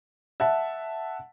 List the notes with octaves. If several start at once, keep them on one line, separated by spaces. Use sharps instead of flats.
E5 F#5 A5